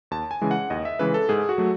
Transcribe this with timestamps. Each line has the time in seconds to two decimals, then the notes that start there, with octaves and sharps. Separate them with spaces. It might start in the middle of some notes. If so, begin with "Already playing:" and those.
0.11 D#2 A5
0.31 G#5
0.42 C#3 E3 G#3
0.51 F#5
0.70 D#2 D#5
0.85 E5
0.99 C#3 E3 G#3 B4
1.14 A4
1.29 G#2 G#4
1.49 F#4
1.58 F#3 A3